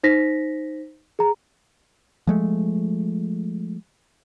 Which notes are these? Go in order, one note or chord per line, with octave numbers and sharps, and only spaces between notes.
D#4 C5 A#6 B6
G#4 A#5
F3 G#3 A3